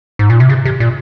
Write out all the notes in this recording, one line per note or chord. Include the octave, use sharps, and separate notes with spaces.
G#2
A#2
C3
C#3
C3
A#2